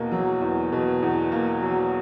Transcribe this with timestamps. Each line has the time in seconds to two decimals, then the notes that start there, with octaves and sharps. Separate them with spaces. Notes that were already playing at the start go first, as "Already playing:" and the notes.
Already playing: E2 B2 A#3
0.12 F#3
0.41 E2
0.72 B2
1.02 E2
1.32 A#3
1.63 F#3